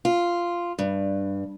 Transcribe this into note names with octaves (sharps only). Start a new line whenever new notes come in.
F4
G2